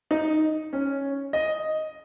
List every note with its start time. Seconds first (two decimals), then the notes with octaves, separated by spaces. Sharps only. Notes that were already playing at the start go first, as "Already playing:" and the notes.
0.11 D#4
0.73 C#4
1.33 D#5